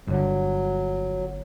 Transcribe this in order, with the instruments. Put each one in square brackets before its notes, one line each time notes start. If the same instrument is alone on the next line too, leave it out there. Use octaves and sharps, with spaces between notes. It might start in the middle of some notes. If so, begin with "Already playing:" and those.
[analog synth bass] G1 [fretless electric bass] G2 D3 [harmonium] F#3